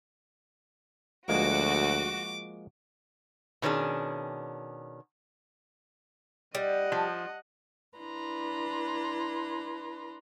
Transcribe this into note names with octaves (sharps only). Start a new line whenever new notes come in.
D2 F3 G#3 A#3 F#4 D6
B2 D#3 C#4 D4 G#4
G3 D#5 F#5
F3
D4 E4 B4 A#5 C6